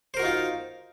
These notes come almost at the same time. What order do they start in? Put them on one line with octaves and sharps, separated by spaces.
C5 A#4 F#4 D#4 F4